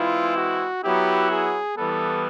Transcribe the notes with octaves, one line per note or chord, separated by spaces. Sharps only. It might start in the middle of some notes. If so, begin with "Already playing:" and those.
Already playing: E3 G#3 C4 E4 F4
F#4
F#3 B3 E4 G4
G#4
E3 G3 B3 A4